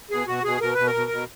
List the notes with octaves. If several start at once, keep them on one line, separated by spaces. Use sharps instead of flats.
B2 G#4
B2 F#4
B2 G#4
B2 A#4
B2 B4
A#4
B2
B2